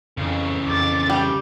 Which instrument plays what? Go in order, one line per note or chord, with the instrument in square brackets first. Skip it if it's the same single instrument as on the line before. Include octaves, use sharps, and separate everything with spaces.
[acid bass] F2 [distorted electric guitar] C#3 E3
[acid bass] F2 [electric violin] D6 A6
[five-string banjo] G3 [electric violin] G4